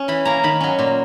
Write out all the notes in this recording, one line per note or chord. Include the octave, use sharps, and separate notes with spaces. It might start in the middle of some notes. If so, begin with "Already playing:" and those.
Already playing: C#4 G#5
E3 B5
A#3 C#4 A#5
D#3 B5
F#3 C#4
A#2